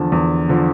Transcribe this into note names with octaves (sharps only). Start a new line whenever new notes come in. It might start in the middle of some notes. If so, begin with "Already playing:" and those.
Already playing: E2 D3 F3 A5
E2
D3 F3